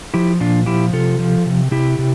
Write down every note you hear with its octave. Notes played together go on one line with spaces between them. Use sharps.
F3 E4 G4
A#2 D4 F4
F3 E4 G4
C3 F4 A4
F3
C3
C3 E4 G4
C3